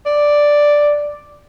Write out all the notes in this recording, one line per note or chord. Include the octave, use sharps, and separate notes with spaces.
D5